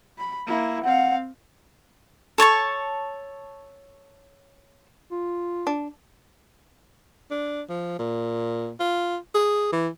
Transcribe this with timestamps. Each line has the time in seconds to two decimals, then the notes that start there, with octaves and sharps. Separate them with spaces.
0.18 B5
0.47 A#3 E4
0.84 C4 F5 F#5
2.38 A4 C#5 A5 C#6
5.11 F4
5.67 D4
7.31 D4
7.69 F3
7.99 A#2
8.80 F4
9.35 G#4
9.72 E3